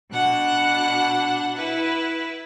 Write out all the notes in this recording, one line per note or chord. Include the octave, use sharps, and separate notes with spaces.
B2 D4 F#5 F#6
E4 B4